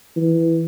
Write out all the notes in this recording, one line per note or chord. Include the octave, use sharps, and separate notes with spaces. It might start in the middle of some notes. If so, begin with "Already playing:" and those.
E3